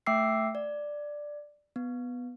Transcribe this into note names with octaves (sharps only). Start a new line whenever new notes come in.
A3 E5 G5 D6 E6 C7
D5
B3